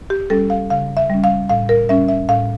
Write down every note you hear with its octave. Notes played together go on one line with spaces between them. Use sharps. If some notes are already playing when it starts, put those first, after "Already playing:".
G4
G3 C#4 A4
F5
C#3 F5
E5
G3 C#4
F5
A2 F5
A#4
G3 C#4 E5
E5
A2 F5